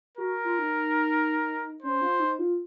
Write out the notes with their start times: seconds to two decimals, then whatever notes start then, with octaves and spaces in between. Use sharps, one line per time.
0.17 F#4 A#4
0.45 F4
0.59 D#4
1.82 C#4 C5
2.01 F4
2.20 D#4
2.39 F4